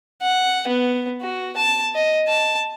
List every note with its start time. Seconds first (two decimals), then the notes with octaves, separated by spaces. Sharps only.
0.22 F#5
0.68 B3
1.21 F#4
1.56 A5
1.95 D#5
2.28 A5